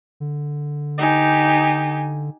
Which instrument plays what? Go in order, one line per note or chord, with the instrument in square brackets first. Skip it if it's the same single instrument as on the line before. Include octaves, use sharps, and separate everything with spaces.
[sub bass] D3
[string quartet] D#4 G4 G#5